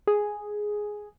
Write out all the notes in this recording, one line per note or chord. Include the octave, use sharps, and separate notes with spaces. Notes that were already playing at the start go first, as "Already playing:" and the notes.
G#4